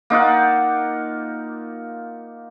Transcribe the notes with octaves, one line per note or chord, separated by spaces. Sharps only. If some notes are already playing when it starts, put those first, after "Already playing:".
A#3 D#4 F4 F#5